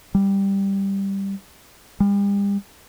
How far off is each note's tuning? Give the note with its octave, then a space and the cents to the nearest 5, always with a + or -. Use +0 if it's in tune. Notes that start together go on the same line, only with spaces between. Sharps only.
G3 +5
G3 +40